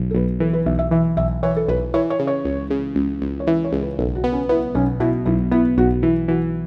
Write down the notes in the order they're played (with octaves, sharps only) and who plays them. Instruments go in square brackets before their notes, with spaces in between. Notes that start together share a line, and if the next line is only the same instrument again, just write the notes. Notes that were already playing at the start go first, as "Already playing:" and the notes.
Already playing: [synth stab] B1
[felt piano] A4
[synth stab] B1 [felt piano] B4
[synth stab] E3 [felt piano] A4
[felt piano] B4
[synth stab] B1 [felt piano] E5
[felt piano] E5
[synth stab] E3 [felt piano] E5
[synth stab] B1 [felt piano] E5
[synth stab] E3 [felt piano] C#5
[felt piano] A4
[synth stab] B1 [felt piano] B4
[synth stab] E3 [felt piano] C#5
[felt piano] C#5
[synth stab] C#3
[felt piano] C#5
[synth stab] C#2
C#3
C#2
C#2
[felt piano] C#5
[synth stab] E3 [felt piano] E5
[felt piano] C#5
[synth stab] C#2
[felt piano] B4
[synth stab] B1 [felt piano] A4
[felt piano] F#4
[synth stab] B3
[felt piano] C#4
[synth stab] B3 [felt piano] E4
[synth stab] B1 [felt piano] C#4
[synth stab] B2 [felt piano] E4
[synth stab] B1 [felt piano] E4
[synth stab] B3 [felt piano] E4
[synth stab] B1 [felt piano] F#4
[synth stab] E3 [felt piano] E4
[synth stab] E3 [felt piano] F#4